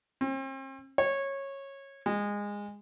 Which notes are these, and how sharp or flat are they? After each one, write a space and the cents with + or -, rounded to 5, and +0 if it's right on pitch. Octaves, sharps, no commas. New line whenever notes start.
C4 +45
C#5 -15
G#3 -20